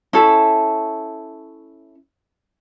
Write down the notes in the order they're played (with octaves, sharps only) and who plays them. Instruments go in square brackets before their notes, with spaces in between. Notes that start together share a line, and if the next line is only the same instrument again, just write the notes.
[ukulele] C#4 E4 A4